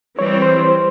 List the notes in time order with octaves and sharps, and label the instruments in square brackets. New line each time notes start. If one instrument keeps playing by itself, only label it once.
[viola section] E3 G3 C4 [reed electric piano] C#5
[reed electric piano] C5